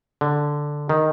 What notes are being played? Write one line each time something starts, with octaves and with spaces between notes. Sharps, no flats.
D3
D#3